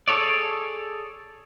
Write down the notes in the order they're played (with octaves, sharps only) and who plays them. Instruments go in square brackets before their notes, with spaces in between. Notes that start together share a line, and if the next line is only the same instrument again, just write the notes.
[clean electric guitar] G#4 A4 C#5 D5